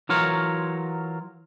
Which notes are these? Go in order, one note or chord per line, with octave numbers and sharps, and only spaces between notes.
E3 F#3 F4 A#4 C#5